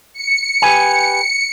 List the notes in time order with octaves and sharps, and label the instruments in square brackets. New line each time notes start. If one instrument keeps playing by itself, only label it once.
[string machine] C#7
[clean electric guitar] G4 B4 G#5